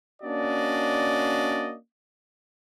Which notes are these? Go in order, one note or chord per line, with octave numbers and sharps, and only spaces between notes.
A#3 C#4 D4 F#4 D5 D#5